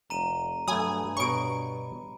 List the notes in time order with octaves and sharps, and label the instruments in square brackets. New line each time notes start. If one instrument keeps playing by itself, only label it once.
[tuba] F1 [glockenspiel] A#5 D#7
[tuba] G2 [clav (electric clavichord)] F#3 A3 [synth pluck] G#5 D#6 [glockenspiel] B5
[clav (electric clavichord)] B2 C#5 A#5 [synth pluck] C#6 D7